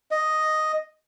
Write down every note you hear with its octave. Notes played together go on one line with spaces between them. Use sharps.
D#5